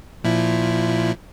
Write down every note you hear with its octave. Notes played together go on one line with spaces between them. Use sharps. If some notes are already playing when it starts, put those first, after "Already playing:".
A#2 F3 E4